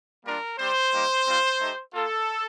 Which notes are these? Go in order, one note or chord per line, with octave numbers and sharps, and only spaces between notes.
G3 A#3 D4 F4 A#4
G3 C4 G4 C5
G3 A#3 D#4 G4
G3 C4 F4
A3 D#4 G4
A#3 F4 A4